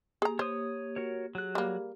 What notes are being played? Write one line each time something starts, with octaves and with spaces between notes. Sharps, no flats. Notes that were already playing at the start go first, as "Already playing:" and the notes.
A#3 G4 G#4 A#5
C5 C#5 D#6
F#4 A#4 C#5
F#3 G4 G#4 F#6
G3 A#3